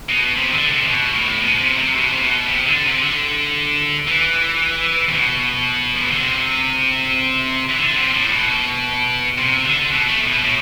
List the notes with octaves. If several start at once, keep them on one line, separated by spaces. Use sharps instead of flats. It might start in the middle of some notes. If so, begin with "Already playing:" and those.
B2
C3
E3
D3
C3
C3
B2
A2
B2
C3
C3
B2
C3
B2
C3
D3
C3
D3
E3
C3
B2
F3
E3
D3
C3
E3
D3
C3
A2
B2
C3
D3
B2
A3
A2
B2
A2